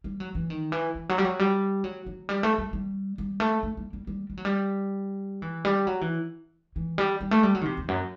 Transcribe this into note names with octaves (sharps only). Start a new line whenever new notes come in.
G3
F#3
E3
D#3
E3
E3
F#3
G3
F#3
G3
F#3
F#3
G3
A3
G3
G3
G3
A3
A3
G3
G3
G3
G3
F#3
G3
E3
G3
F#3
E3
E3
G3
G3
A3
G3
F#3
D#3
C3
E2
F#2